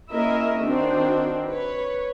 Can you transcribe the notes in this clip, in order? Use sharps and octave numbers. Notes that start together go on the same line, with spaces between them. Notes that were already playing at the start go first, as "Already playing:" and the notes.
A#3 C#4 E4 A#4 D#5 E5
D#3 C4 D4 F#4
B4 C#5